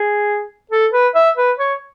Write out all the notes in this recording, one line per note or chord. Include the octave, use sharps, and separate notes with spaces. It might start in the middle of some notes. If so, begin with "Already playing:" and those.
Already playing: G#4
A4
B4
E5
B4
C#5